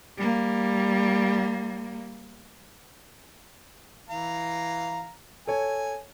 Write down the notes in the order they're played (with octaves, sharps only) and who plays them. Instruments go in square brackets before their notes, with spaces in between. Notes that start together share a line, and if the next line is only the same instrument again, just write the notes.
[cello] G3 A#3
[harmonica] E3 F5 A#5
[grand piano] A4 C#5 [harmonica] G#5